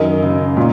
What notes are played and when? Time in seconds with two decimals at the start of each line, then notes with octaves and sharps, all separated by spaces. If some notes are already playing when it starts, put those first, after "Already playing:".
Already playing: F#2 D#3 A#4 D#5
0.23 C#3
0.57 A#2